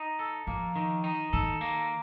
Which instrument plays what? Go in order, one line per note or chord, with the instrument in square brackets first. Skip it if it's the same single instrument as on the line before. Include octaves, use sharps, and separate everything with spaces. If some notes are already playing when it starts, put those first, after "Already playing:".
Already playing: [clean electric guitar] D#4
A4
[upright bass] F3 [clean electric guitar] A#3
[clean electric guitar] D#3
D#4
[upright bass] D#3 [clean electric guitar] A4
[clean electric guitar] A#3